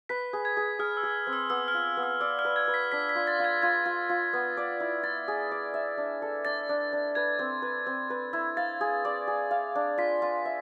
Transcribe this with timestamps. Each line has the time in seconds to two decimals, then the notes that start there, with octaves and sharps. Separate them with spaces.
0.09 B4 B6
0.33 G#4
0.45 G#6
0.57 G#4
0.79 G#4 F6
0.97 E6
1.03 G#4
1.27 C4
1.33 E6
1.50 B3 E6
1.68 F6
1.74 F4
1.97 B3
2.03 E6
2.20 D5 E6
2.39 F6
2.45 B4
2.56 G#6
2.68 B4
2.74 B6
2.92 D4 B6
3.09 B6
3.15 F4
3.27 A6
3.39 F4 G#6
3.62 F4 G#6
3.86 F4
4.09 F4
4.33 B3
4.57 D5
4.80 E4
5.03 E4 A6
5.28 G#4
5.51 D5
5.74 E5
5.97 D4
6.22 A4
6.45 D4 A6
6.69 D4
6.93 D4
7.15 B4 G#6
7.39 C4
7.62 B4
7.86 C4
8.10 B4
8.33 E4
8.57 F5 A6
8.81 G#4
9.05 D5
9.27 G#4
9.51 F5
9.75 D4
9.98 F4 B6
10.22 F4
10.45 E5